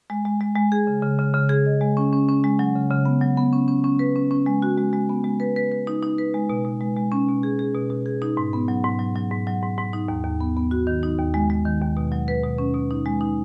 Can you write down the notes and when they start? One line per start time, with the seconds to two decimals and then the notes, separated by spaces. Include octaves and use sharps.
0.10 G#3
0.25 G#3
0.41 G#3
0.56 G#3
0.72 G#4
0.87 C#3
1.03 C#3
1.19 C#3
1.34 C#3
1.49 G#4
1.66 D#5
1.81 G#3
1.97 C#4
2.13 C#4
2.28 C#4
2.44 G#3
2.59 F#3
2.75 C#3
2.90 C#3
3.05 B3
3.21 F#3
3.37 B3
3.53 C#4
3.68 C#4
3.84 C#4
3.99 B4
4.16 C#4
4.31 C#4
4.46 G#3
4.62 F#4
4.78 G#3
4.93 G#3
5.09 B3
5.24 G#3
5.40 B4
5.56 B4
5.72 B4
5.87 D#4
6.03 D#4
6.18 B4
6.34 G#3
6.50 B2
6.65 B2
6.81 G#3
6.96 G#3
7.12 C#4
7.28 B2
7.43 G#4
7.59 G#4
7.75 B2
7.90 B2
8.06 G#4
8.22 D#4
8.37 G#2
8.53 B3
8.68 F#3
8.84 G#2
8.99 F#3
9.16 F#3
9.31 G#2
9.47 F#3
9.62 G#2
9.78 G#2
9.93 D#4
10.08 D#2
10.24 D#2
10.41 B3
10.57 B3
10.71 F#4
10.87 D#3
11.03 D#4
11.19 D#2
11.34 G#3
11.50 G#3
11.65 D#3
11.81 D#2
11.97 B2
12.12 F#3
12.28 B4
12.44 B2
12.58 C#4
12.75 B2
12.91 D#4
13.05 G#3
13.21 D#4